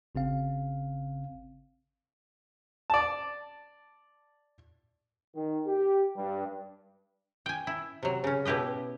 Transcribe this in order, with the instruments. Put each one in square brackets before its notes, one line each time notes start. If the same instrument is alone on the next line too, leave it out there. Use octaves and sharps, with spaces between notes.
[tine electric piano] G#1 C#3 C4 F5
[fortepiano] D5 A5
[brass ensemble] D#3
G4
G2
[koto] G5 G#5
E4
C3 F#3
C#3 C#4
B2 E4 G4 B4 D#5